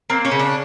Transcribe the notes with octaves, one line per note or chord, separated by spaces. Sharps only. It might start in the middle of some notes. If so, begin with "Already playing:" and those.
A#3 C4
C#4
C#3
D4